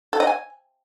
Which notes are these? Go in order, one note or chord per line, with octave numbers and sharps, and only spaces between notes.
A4
D#5
G#5